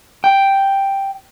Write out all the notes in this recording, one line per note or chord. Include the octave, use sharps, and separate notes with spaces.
G5